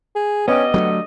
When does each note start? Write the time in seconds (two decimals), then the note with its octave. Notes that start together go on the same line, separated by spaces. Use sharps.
0.16 G#4
0.48 G2 G3 B3 C#4 B4 D#5 G5
0.74 D3 F#3 G#3 A3